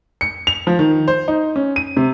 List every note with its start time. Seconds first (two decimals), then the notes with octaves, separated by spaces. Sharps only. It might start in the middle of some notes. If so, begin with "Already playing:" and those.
0.21 C#7
0.47 F7
0.67 F3
0.79 D#3
1.08 C5
1.28 D#4
1.56 C#4
1.76 D#7
1.97 C3